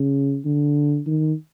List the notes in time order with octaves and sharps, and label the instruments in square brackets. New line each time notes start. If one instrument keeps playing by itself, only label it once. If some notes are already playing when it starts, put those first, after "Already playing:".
Already playing: [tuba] C#3
D3
D#3